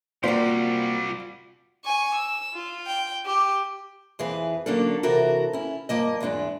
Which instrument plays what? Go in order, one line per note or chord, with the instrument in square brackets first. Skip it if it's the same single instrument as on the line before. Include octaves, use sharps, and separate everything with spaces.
[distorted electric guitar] C3 G3 [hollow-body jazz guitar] A#3 C5 [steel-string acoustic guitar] F4 F#4 [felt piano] D5
[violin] G#5 C#6
E6
F4
G5
G4
[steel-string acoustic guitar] F2 E3 G#4 B4
D3 F#3 A#3 C#4 D4 A4
C3 E3 F#4 A4 A#4
C#4 E4
G2 F3 A#3 D#5
E2 G#2 G#3 D4